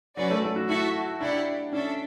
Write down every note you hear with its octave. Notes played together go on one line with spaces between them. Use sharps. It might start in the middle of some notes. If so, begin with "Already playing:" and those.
F#3 C#4 F#4 B4 D5
A3
A3
F#4
E4 F#4 A4 E5 A5
D4 E4 G4 D5 F#5
C#4 D4 A4 E5